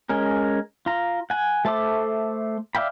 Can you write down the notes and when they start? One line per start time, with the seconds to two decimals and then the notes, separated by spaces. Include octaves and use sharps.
0.09 G#3 C#4 A#4
0.86 F4 A#5
1.30 F#5 G#5
1.65 A3 A4 C5 E5 D6
2.75 D5 E5 F5 G5 B5